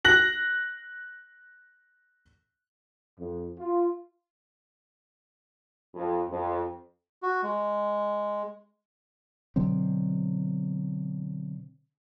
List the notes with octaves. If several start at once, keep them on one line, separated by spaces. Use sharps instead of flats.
F#6 A#6 F#7
F2
F4
F2
F2
F#4
G#3
B2 D3 F#3 C4